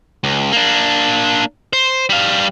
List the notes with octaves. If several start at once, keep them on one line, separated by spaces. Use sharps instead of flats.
C#2
A#3 D4
C5
G3 F5